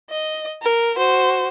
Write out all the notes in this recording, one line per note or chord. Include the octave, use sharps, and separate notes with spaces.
D#5
A#4
F#4 C5